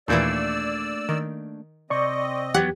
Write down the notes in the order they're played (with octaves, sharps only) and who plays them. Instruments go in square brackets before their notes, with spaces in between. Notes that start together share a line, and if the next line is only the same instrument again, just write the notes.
[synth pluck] D#2 A#2 E3 [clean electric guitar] A3 A#3 D4 [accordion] D5 E6
[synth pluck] D#3
[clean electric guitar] C3 [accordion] C4 D#5 [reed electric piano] D5 C#6
[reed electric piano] E2 G4 [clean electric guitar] F#3 B3 [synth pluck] F#5